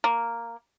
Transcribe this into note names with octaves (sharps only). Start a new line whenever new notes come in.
A#3